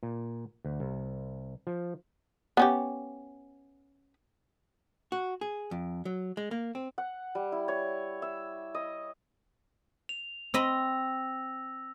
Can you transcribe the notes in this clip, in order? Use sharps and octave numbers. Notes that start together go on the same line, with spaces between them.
A#2
D2
C2
F3
B3 C#4 G4
F#4
G#4
F2
F#3
G#3
A#3
C4
F#5
G3
E4
C#5
E5
D#5
F7
C4 D#5 B5 E6 A#6